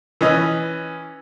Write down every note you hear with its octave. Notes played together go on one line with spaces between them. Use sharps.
E3 C#4 D#5